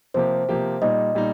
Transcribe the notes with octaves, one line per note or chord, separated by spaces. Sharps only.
C3 F3 A#3 G4 C5
C3 F3 A#3 G4
A#2 G3 D#4 D#5
A#2 G3 D#4